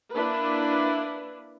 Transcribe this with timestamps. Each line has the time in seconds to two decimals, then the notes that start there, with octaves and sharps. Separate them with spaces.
0.13 A#3 D4 E4 B4